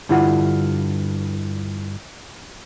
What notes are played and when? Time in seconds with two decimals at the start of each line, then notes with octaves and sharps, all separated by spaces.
0.09 G2 D3 E4 F4 F#5